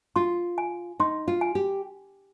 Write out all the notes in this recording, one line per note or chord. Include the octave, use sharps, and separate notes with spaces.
F4 C6
G#5
D#4 C6
F4
G#5
G4